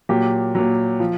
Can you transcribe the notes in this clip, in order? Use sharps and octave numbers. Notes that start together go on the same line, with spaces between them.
A#2 F#3 G4
A#2 F#3
F3